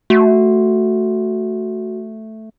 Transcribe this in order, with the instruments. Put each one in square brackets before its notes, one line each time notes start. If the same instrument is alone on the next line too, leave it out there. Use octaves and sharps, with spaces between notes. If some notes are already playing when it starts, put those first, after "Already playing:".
[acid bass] A3 [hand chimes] F#4